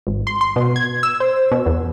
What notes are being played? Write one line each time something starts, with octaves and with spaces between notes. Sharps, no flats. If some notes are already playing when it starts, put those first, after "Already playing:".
G#1
C6
C6
B2
G#6
E6
C5
B2
E2